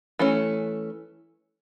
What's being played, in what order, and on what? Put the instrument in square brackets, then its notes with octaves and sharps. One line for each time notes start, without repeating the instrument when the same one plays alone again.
[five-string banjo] E3 A3 C#4